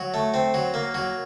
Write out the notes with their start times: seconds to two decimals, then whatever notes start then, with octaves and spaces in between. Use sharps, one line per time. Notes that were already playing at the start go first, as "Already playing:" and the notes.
Already playing: F#3
0.14 A3
0.34 C4
0.54 F#3
0.74 A#3
0.94 F#3